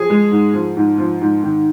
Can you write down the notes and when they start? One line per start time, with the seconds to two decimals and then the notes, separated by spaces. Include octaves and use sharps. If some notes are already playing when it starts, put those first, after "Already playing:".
Already playing: F3 G#4
0.10 G#3
0.31 G#2
0.54 F3
0.77 G#2
0.98 F3
1.21 G#2
1.43 D#3